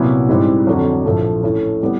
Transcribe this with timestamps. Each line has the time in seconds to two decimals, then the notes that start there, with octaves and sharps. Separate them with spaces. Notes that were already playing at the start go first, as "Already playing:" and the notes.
Already playing: C2 A#2 F#3 B3 E4
0.29 G#2 E3 G3 C4 E4
0.67 F2 D3 F#3
1.06 A#1 A2 F3 A3
1.44 A2 E3 A3 C#4
1.82 E3 G3 B3 E4